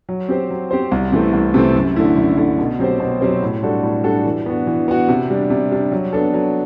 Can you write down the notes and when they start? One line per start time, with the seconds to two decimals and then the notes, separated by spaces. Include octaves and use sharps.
0.09 F#3
0.29 C4 G4 C5
0.51 F#3
0.71 C4 G4 C5
0.91 C2
1.12 C3 E3 A3 C4
1.33 C2
1.54 C3 E3 A3 C4
1.75 F#2
1.96 D3 A3 E4
2.17 F#2
2.38 D3 A3 E4
2.59 B2
2.79 F#3 C4 G4 C5
3.00 B2
3.21 F#3 C4 G4 C5
3.42 A2
3.63 G3 D4 F#4 A4
3.83 A2
4.04 G3 D4 F#4 A4
4.25 E3
4.46 B3 D4 F#4
4.67 E3
4.88 B3 D4 F#4
5.08 C3
5.30 G3 D4
5.50 C3
5.71 G3 D4
5.92 F#3
6.13 B3 D4 A4
6.34 F#3